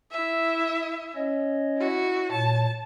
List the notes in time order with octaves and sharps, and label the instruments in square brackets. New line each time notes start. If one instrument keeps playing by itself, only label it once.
[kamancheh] E4 E5
[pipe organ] C#4 C#5 D#5
[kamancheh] E4 F#4
[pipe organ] A#2 C#5 [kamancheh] A5